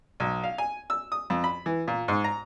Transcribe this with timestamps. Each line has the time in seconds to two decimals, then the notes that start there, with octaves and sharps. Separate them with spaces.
0.20 B1
0.44 F5
0.58 G#5
0.90 E6
1.12 D#6
1.30 F2
1.44 B5
1.66 E3
1.88 A#2
2.08 G#2
2.24 A#5